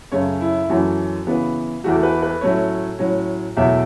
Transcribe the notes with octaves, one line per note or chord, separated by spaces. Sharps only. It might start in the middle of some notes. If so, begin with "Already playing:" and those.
F#2 C#3 A3 C#4 C#5
E4
F#2 E3 A3 C#4 F#4
C#3 E3 B3
E2 E3 A3 F#4
A4
B4
B4
A2 F#3 A3 C#4 C#5
A2 F#3 C#4
E2 B2 F#3 A3 E5